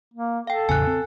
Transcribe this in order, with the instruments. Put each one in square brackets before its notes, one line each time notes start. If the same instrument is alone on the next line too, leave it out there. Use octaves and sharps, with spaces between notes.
[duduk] A#3
[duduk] A4 [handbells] F5 G5
[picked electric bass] A1 E2 C#3 [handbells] G#5 F#6
[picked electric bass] C4